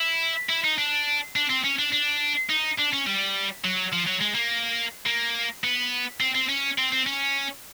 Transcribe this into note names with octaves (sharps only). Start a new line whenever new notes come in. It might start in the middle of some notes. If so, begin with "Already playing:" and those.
Already playing: E4
E4
D#4
D4
D4
C4
C#4
D4
D4
D#4
D4
C#4
G3
F#3
F3
F#3
G#3
A#3
A#3
B3
C4
C4
C#4
C4
C4
C#4